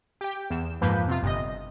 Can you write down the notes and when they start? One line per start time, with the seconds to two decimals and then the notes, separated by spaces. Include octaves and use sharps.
0.21 G4 G5
0.50 E2 E7
0.81 F2 G#2 F3 A#3 B4 G6
1.08 C3 F4
1.23 G1 C3 D#5